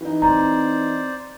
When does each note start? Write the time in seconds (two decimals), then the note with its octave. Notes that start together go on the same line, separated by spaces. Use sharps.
0.01 E3 D#4
0.22 C4 C5 D5 A#5